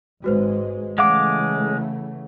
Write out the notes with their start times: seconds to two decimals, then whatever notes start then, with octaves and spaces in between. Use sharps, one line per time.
0.24 G#1 G#2 G#3 F#4 B4 C5
0.98 C#3 E3 G#3 A3 F5 F#5 D6